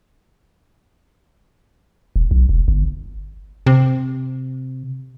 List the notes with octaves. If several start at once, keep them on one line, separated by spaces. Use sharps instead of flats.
D#1
B1
E1
G1
C3